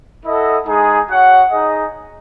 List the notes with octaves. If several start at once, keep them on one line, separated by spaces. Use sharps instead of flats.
E4 A4 D#5 F#5
G#3 D#4 G#4
F#4 C#5 F#5
D#4 G#4 D#5